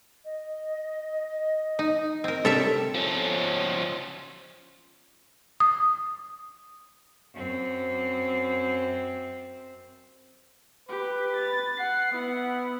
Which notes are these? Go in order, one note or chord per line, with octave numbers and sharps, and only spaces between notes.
D#5
D#4
C4 A#4
C3 G3 D4 G#4 A4 C#5 E5
F3 C#4
D#6
F#2 C4
G4 B4
A6
F#5 C7
B3 E4 F#5